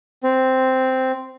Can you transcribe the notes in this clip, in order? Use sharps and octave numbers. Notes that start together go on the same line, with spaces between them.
C4